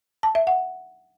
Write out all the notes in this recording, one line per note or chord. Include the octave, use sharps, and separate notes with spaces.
A5
E5
F#5